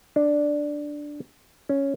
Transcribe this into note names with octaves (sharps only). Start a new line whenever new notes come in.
D4
C#4